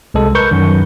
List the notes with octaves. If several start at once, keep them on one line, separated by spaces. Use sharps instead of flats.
C2 C3 G#3 A4
A#4 B4 C#6 G6
F#2 D#3